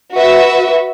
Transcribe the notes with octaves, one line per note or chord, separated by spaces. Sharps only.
F#4 B4 E5